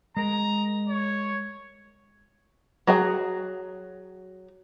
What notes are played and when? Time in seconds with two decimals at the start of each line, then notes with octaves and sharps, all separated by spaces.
0.17 G#3 A#4 A#5
0.89 C#5
2.87 F#3 F#4 G#4 G5